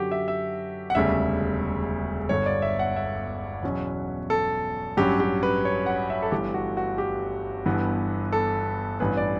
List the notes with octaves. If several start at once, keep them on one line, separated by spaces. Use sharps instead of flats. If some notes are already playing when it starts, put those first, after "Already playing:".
Already playing: F#2 D3 F#3 F#4 G4
E5
E5
F#5
E1 D2 C#3 G3 E5
G1 G2 D3 C#5
D5
E5
F#5
E5
E2 B2 F#3 C#4
A4
A1 G2 F#3 C#4 G4
G4
B4
C#5
F#5
E5
A4
G1 G2 E3 A3 G4
F#4
F#4
G4
G1 G2 E3 B3
A4
A1 G2 E3 B3 B4
D5